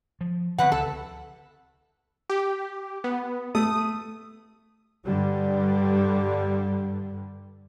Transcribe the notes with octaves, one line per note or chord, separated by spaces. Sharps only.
F3
E2 D3 C4 B4 F#5
C#2 A4
G4
B3
A3 D#6
G2 D3 G3